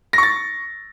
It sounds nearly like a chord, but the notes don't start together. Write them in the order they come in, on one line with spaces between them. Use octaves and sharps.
A#6 C#6 A6